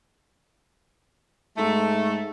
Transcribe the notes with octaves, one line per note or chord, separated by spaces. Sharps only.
G#2 A3